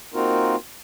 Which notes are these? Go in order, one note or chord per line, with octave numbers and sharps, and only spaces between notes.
A#3 C4 D#4 F4 F#4 A#4